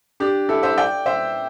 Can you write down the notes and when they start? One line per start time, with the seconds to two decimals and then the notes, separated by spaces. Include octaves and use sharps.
0.20 D4 G4
0.49 E4 A4
0.63 C5 E5
0.77 D5 G5
1.06 C5 E5